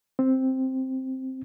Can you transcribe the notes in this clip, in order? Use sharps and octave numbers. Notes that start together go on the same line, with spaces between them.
C4